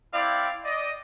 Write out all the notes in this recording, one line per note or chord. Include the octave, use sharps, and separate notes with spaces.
C4 E4 D5 F5 G5
D5 D#5